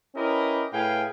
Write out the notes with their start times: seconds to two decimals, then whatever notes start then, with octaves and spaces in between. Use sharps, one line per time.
0.15 C#4 E4 G4 A#4 B4 D#5
0.73 A2 G#4 B4 F5 G5 G#5